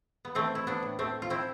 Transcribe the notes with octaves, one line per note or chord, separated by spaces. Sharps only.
B3
E3 A3 C4
E4
B3 D4
A2
A3 C4
F4
A3 C4 E4